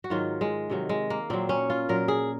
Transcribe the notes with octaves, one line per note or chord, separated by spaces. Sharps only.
F#4
G#2 D#3 F#3 F4
G#3
C3 D#3 F#3
G#3
A#3
A#2 F#3 C4
C#4
F4
A#2 F#3 A#4
G#4